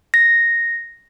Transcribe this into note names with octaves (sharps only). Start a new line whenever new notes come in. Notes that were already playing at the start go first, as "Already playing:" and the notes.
A#6